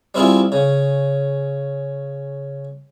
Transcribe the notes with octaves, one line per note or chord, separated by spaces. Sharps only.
G3 C4 E4 F4 G#4
C#3